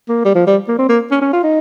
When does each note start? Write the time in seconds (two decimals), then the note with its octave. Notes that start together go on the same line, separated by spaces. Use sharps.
0.08 A#3
0.25 G3
0.35 F3
0.47 G3
0.68 A#3
0.78 C4
0.89 A#3
1.11 C#4
1.21 C#4
1.33 F4
1.43 D#4